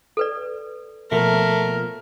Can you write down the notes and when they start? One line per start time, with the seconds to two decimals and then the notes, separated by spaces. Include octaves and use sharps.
0.17 A4 B4 D5
1.12 B2 F3 A3 A#3 A#4